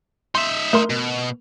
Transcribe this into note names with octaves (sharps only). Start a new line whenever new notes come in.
D#4 E5 C6
A3 A#4 C6
B2